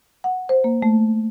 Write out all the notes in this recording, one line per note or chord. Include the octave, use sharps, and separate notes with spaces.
F#5
C5
A#3
A3